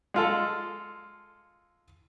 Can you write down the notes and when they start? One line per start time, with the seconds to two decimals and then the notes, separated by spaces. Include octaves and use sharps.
0.14 G#3 F4 A4